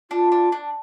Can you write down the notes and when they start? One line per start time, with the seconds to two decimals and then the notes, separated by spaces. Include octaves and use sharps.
0.11 D4 F4
0.32 D4
0.52 D4